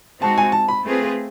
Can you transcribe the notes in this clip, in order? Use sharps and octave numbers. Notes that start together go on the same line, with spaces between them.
G#3 C4 D#4 F#4 A5
G#5
A5
B5
A3 C4 F4 G#4 B4